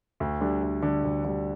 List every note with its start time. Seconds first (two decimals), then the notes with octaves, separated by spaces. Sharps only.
0.20 D2
0.41 D3 G3
0.63 D2
0.82 D3 G3
1.04 D2
1.24 D3 G3